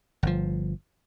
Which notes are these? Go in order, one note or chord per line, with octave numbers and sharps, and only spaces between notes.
G1 F3